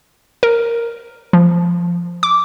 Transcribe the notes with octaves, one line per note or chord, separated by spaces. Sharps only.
A#4
F3
D6